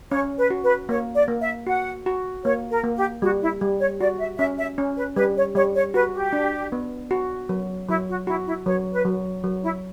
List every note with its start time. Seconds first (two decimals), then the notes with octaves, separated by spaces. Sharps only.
0.11 C#4 C#5
0.38 B4
0.50 F#4
0.63 B4
0.89 A#3 C#5
1.15 D5
1.28 A#3
1.41 E5
1.67 F#4 F#5
2.06 F#4
2.44 A#3 C#5
2.70 A#4
2.83 A#3
2.96 G4
3.22 G3 F#4
3.42 E4
3.61 G3
3.81 C#5
4.00 F#4 D5
4.20 E5
4.39 C#4 E5
4.58 E5
4.78 C#4
4.97 B4
5.16 G3 B4
5.36 C#5
5.55 G3 C#5
5.75 C#5
5.94 F#4 B4
6.14 G4
6.33 D4
6.72 B3
7.11 F#4
7.49 F#3
7.88 F#3 E4
8.08 F#4
8.27 E4 F#4
8.47 E4
8.66 F#3 C#5
8.92 B4
9.05 F#3
9.44 F#3
9.63 E4